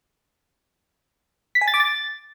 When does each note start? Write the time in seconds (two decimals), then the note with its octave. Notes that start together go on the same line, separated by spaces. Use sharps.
1.55 B6
1.61 G#5
1.68 A6
1.74 D6
1.80 A6